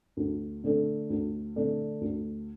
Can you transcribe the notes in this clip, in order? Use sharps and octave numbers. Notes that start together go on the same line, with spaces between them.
D2
D3 A3 D4 A4
D2
D3 A3 D4 A4
D2